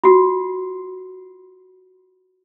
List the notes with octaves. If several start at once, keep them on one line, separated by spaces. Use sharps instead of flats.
F4 F#4